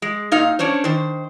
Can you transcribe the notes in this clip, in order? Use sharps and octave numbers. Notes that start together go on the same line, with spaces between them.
G#3
A#2 D#4 F5
C#4 D4 C5 C#5
D#3 C5